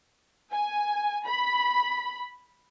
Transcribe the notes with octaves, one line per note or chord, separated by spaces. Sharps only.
G#5
B5